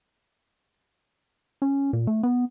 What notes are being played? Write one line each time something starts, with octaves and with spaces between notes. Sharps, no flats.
C#4
A#2
A3
B3